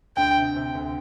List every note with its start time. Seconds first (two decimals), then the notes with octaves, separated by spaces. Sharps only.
0.16 D2 D3 G5
0.37 C3
0.56 C3
0.75 D2 D3